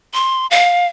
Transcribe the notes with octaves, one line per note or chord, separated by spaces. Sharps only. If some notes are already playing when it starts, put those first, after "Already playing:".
C6
F5